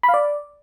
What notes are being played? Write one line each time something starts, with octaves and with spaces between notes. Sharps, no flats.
B5
F5
D5